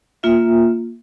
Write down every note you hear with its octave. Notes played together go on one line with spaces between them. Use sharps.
A#3 F4 E5